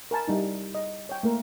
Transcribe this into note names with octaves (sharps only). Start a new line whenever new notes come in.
A#4 G#5 A5 B5
G3 D#4 E4
D#5
C#5 G5
A3 A#3 A#4